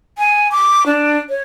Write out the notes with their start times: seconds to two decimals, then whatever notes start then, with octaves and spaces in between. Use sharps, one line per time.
0.18 G#5
0.52 D6
0.86 D4
1.29 C#5